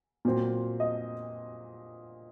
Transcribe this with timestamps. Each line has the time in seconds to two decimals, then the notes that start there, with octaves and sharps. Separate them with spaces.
0.25 A#2 F#3 C4
0.80 D#5